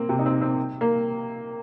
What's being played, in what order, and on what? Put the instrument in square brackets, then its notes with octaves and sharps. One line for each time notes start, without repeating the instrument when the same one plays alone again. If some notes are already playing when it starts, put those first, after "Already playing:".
Already playing: [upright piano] A#3 C4
C3
D#4
C4
C4
A#3